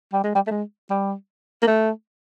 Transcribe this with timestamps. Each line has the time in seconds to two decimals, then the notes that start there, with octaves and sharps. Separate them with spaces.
0.13 G3
0.24 G#3
0.35 G3
0.47 A3
0.51 G#3
0.90 G3
1.62 A#3
1.67 A3